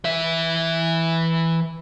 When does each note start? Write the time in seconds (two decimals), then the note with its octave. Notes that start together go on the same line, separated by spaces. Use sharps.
0.05 E3 E5